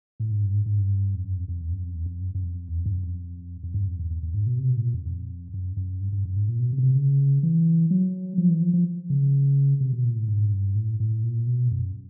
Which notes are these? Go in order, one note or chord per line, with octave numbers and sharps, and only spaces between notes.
A2
G#2
G2
G#2
G#2
G2
F2
F#2
F2
F2
E2
F#2
F2
E2
F2
F#2
F#2
F2
E2
F2
G2
F#2
F2
F2
G2
F2
E2
E2
E2
G#2
B2
C3
B2
A2
A#2
F2
F2
F#2
F#2
G2
G2
F#2
G#2
A#2
B2
C3
B2
C3
C#3
E3
F#3
F3
E3
F3
F3
C#3
C3
B2
A#2
A2
G#2
G2
A2
A2
A#2
B2
F#2